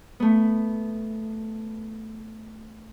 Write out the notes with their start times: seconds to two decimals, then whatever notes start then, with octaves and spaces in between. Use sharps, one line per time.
0.20 A3 B3